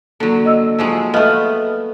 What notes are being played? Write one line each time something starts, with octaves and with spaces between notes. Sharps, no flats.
D3 F#3 A#3
D#5 E6
F3 F#3 G#3
A3 B3 D#5 F5 F6